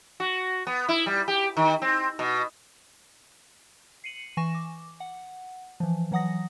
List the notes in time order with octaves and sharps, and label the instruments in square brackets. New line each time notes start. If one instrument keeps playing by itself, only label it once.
[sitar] F#4
B3
E4
G3
G4
D#3
C4
B2
[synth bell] C7 C#7 D#7 F#7
E3 G#5 C#6 A#6 E7
D6
F#5
E3 F3
E3 F#3 F#5 D#6 A#6